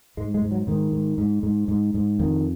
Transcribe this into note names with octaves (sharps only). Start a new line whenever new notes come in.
G#2 G#3
G#3
G#2
F#3
G#2 D#3
G#2
G#2
G#2
G#2
G#2
F2 D#3